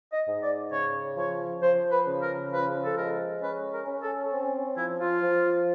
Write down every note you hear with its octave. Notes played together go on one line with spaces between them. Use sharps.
D#5
G#2
D5
C#3 C#5
F3 C#5
F3 C5
B4
C#3
A#4
F3 B4
A4
G#3 A#4
C#4 B4
A#4
C#4
A4
C4
F3 E4
F4
F3